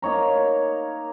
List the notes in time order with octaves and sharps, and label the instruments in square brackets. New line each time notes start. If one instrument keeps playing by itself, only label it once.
[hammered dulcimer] A#3 D#4 C#5 A#5